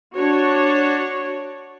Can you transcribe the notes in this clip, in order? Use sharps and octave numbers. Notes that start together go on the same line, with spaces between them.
D4 F#4 C#5